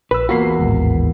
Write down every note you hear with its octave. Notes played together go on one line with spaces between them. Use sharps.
A#1 B4 E6
E2 A#3 F4 F#4 B5 C7
A1 D#2 G#2